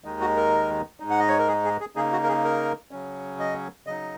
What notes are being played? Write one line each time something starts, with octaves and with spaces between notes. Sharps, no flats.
D#2 D#3 G#3 D#4
F#4
A#4
G#2 G#3 D#4
F#5
D#5
C#5
A#4
G#4
G#4
G#4
C#3 A#3 D#4 G#4
F#4
A#4
G#4
A#4
C#3 F#3 C#4
D#5
C#3 F#3 D#4 D#5